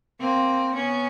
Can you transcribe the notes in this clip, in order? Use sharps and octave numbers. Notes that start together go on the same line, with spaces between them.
A#3 C4
B3 C#4